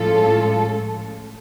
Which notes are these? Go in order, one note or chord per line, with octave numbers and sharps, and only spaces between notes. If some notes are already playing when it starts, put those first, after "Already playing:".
Already playing: A2 F3 G#3 C#4 F4 A4